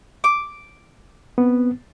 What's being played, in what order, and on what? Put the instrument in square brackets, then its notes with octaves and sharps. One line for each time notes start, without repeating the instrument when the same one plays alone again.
[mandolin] D6
[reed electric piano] B3 C4